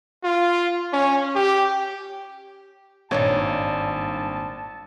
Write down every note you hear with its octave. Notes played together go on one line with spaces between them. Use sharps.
F4
C#4
G4
G#1 G2 A#2 D4 D#4 C#5 A5